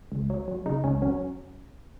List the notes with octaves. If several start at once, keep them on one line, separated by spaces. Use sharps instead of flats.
C#2
F#3
F#3
C#3 D#4
C#2 C#4
F#3 C#4